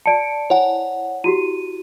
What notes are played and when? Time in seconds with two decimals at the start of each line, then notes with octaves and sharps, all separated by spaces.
0.06 D5 A5 C#7 D7
0.50 E4 C5 C#5 F#5 G#5
1.24 E4 F#4 G4 D#7